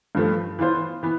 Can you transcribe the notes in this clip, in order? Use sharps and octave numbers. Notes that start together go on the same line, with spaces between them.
G2 F3 A3
E3 B3 F4 C5
E3 B3